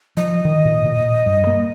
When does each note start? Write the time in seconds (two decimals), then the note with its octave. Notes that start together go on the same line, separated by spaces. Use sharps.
0.17 F3 D#5
0.45 D#3
0.65 A#2
0.86 A#2
1.26 G2
1.47 A#3